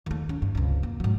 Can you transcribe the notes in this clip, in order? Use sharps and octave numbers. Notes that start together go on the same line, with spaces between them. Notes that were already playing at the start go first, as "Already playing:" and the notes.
D#2 A3
C#4
G2
C#2 C3
A#3
G#2 F#3